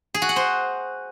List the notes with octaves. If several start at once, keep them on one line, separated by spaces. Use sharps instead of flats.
G#4
F#4
F#5
C5